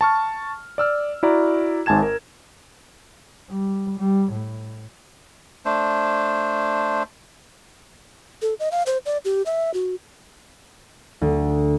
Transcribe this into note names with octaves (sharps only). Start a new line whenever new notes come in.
A5 C#6 F6
D5 E6 F6
E4 F#4 D5 A#5
G#1 G#2 G#5 A5 G#6 E7
A#4
G3
G3
A2
A3 D4 C5
A4
D#5
F5
C5
D5
G4
E5
F#4
D2